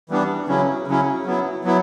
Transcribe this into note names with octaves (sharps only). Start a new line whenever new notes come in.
E3 G3 B3 D4
C#3 F#3 C#4 E4
C#3 F#3 C#4 E4
F#3 B3 E4
F#3 B3 E4